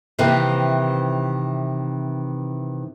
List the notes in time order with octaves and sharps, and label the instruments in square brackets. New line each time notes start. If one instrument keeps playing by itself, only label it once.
[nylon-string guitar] C3 D#3 E3 A#3 C4